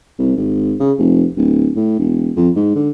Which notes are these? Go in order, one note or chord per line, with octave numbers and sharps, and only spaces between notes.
C2
G#1
C#3
F1
D1
A2
E1
F2
G#2
D3